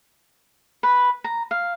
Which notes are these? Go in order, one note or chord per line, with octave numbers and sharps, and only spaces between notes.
B4
A#5
F5